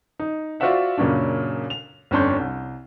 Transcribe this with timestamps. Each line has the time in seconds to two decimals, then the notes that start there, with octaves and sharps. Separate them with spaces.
0.20 D#4
0.60 F4 F#4 C5 D5 E5 F#5
0.98 F#2 A#2 C#3 C#4 D4
1.70 F7
2.11 G1 F2 C#4 D4 C6 G6
2.40 C2